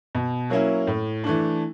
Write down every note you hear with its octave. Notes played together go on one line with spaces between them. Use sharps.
B2
F#3 A#3 C#4 E4
A2
E3 A3 D4